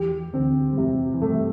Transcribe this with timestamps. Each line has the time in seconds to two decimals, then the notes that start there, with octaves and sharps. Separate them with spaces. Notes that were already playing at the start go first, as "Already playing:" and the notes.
Already playing: E2 E3 G4
0.33 D2 D3 C4
0.73 G3
0.77 E2 C3 E3
1.14 E3
1.22 G2 G3 A3